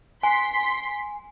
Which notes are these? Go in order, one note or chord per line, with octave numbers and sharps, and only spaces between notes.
G#5 C6 B6